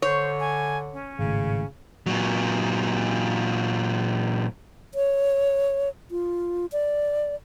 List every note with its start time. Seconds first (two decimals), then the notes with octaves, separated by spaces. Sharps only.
0.02 D3 C5 C#5
0.40 G#5
0.93 C#4
1.19 G#1 A2 C#3
2.06 A#2 F#3
4.94 C#5
6.11 F4
6.72 D5